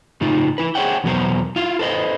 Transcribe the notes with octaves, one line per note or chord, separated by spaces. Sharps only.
A2 C#3 D#4 F4
E4 B4
G#4 C5 C#5 E5 F#5 G5
E2 B2 F#3 B3 A#4 C5
E4 F4 F5
A4 B4 C5 D#5